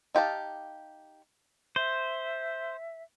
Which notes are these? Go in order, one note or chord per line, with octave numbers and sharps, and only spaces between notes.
D#4 G4 F5 A5
C5 E5